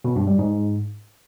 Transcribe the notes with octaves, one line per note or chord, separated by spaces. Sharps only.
B2
G2
G3
G#2